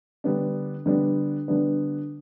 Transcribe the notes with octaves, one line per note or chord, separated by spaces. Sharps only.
D3 G3 B3 D4
D3 G3 B3 D4
D3 G3 B3 D4